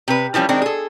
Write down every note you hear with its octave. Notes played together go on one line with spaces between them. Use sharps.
C3 B4
E3 F3 G3 C#4
D#3 G#3 C4 D4
G#4 A4